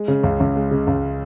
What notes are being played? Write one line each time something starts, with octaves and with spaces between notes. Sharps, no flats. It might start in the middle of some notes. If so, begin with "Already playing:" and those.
Already playing: G#3
C#3
C#2
C#2
G#3
C#3
C#2